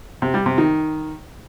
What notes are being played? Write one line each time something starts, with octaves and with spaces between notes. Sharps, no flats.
C3
G3
C3
D#3